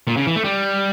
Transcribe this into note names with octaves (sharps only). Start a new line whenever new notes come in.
A#2
C#3
E3
A3
G3